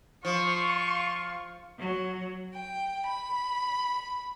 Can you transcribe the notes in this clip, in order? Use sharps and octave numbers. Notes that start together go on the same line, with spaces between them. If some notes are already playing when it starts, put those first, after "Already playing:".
F3 F4 C#6
F#3
G5
B5